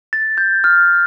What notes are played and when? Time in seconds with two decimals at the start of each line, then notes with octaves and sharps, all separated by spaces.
0.13 A6
0.38 G6
0.64 F6